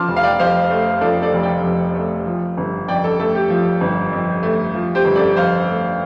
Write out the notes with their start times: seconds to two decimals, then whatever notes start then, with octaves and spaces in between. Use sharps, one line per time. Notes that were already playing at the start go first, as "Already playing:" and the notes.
Already playing: F3 A5 C6 D6 F6
0.08 F1
0.16 F5
0.23 D5 G5
0.39 F2 C5 F5
0.71 A3
1.01 F3 A4 D5
1.22 A4 D5
1.33 F1
1.43 D5 G5
1.64 F2
1.95 A3
2.26 F3
2.57 G1
2.88 F2 D5 G5
3.04 A4
3.20 A3 A4
3.35 G4
3.50 F3
3.81 G1
4.13 F2
4.43 A3
4.74 F3
4.95 G4 C5
5.05 G1
5.15 A4 D5
5.36 F2 C5 F5
5.68 A3